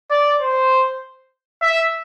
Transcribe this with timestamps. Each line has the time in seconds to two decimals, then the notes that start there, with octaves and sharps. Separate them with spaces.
0.11 D5
0.41 C5
1.62 E5